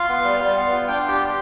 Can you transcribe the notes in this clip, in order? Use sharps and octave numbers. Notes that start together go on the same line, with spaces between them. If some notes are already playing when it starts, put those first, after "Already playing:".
Already playing: F4 F5
B3
G3
G3
B3
F4
D4 G5
F4 G4 G5
G3